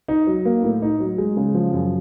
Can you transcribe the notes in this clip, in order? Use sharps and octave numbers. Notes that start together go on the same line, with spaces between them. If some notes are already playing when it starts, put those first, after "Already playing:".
D#4
F#3
A#3
A2
D#4
F#3
G#3
C#3
F3
F#2